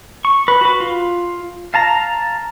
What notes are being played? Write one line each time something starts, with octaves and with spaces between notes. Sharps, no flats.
C#6
B4
F#4 B4
F4
F5 A5 A#5